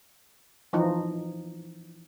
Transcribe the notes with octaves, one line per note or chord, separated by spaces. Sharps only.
E3 F3 D#4